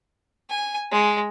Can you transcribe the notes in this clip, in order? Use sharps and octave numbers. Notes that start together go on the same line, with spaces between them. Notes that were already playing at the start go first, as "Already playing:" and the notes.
G#5
G#3